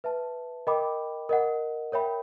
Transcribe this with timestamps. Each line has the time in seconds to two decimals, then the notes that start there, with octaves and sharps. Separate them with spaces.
0.04 B4 E5 A5
0.67 A#4 D#5 G5 B5 D6
1.29 A#4 D#5 F#5
1.92 A#4 C#5 E5 G5 B5